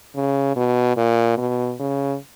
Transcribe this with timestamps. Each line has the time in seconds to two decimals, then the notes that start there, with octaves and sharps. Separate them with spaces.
0.15 C#3
0.56 B2
0.97 A#2
1.37 B2
1.79 C#3